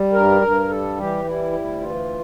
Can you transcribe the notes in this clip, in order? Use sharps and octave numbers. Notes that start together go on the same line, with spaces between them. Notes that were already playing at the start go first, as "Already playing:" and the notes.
Already playing: G3
G2 A#4
G2
G3 A4
E3 G4
G3 E4
D2
E3 F4